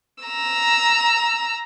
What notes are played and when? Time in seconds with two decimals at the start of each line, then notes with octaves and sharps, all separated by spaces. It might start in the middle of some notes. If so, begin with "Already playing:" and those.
0.24 A#5 E6